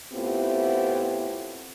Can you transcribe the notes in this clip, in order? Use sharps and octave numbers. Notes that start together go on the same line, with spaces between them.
A2 B3 C4 E4 F4 G4